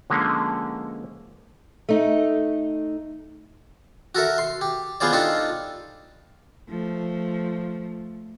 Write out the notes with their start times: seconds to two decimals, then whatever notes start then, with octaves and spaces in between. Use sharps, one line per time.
0.10 D3 F3 G#3 A#3 C#4
1.89 A3 D#4
4.15 F#4 A4 A#4 E5
4.38 C6
4.61 G4
5.00 B3 F4 G#4 C5 D5
5.12 D4 D#4 F4 G4 A4 C5
6.69 F3 A3